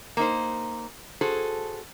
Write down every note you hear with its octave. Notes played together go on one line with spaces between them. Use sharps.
A#3 D#4 C5
F#4 G#4 A4 C5